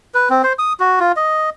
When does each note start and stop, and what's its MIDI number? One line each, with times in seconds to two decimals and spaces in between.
0.14 0.29 71
0.30 0.42 60
0.44 0.53 72
0.59 0.73 87
0.80 0.99 66
1.00 1.12 65
1.16 1.50 75